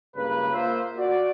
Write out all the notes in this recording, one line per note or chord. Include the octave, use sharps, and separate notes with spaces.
C#2 G2 C#3 A#3 B4
A#3 F4 C5 E5
F#4 D5